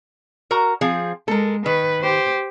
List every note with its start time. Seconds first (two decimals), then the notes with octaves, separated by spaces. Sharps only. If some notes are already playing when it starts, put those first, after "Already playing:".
0.51 F#4 A#4 A#5
0.81 F3 C4 G#4
1.28 G#3 A4 A#4
1.66 D#3 B4
2.01 G4 C5